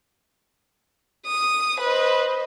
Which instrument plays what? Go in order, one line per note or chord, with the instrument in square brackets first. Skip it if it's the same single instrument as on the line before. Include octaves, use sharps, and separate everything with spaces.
[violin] D#6
[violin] B4 [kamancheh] C5 D#5